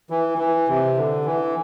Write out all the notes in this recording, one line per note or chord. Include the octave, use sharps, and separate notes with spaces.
E3
E3
C3
D3
E3